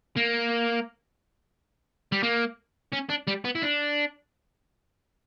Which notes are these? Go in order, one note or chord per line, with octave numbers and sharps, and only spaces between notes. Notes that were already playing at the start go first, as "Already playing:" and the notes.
A#3
G3
A#3
C#4
D4
G3
B3
E4
D4